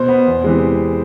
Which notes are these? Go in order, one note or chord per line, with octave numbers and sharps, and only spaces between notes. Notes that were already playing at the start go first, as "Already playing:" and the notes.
Already playing: B2 C5
B3
E2
C3 E3 G#3